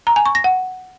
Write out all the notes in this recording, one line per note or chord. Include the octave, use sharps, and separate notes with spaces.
A#5
G#5
C#6
A#6
F#5